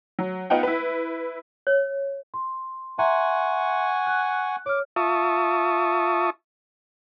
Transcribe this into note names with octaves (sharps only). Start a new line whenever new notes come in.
F#3
B3 D#4 F4 F#5 G5
E4 B4
C#5
C6
E5 F#5 G#5 A#5 C6 C#6
F#6
C#5 D6 F6
F4 E5 A5 C#6 D#6